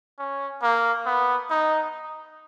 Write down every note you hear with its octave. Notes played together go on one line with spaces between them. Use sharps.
C#4
A#3
B3
D#4